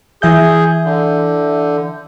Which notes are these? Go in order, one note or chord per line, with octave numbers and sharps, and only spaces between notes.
E3 G#4 E5 G6
D3